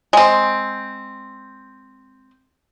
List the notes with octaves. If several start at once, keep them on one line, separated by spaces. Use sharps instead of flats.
G#3 C4